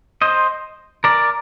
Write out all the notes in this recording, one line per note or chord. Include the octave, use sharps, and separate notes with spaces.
C5 D#5
A#4 D5